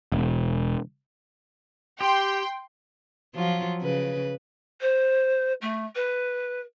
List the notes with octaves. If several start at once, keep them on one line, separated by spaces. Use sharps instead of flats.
E1
G4 G5 C6
F3 F#3 F4
C#3 B4
C5
A3
B4